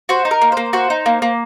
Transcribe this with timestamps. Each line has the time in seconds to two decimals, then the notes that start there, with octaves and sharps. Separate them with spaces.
0.09 F#4 C5
0.25 D#4
0.31 A#4
0.41 A#3
0.52 A#3 C5
0.73 F#4 C5
0.90 D#4
1.06 A#3
1.22 A#3